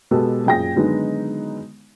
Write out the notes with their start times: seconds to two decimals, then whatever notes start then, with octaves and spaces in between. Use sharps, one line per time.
0.11 B2 G#3 B3 G4 A4
0.46 F#2 A#2 G#4 G5 G#5 A#6
0.76 D3 D#3 F#3 G#3 B3 D#4